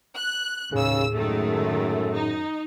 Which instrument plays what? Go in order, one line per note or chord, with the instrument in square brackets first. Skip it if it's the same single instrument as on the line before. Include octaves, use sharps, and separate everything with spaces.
[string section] F#6
[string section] D#2 E6 [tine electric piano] A2 G#4 [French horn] C#3
[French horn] F#2 [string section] D#3 G#3 A3
[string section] D#4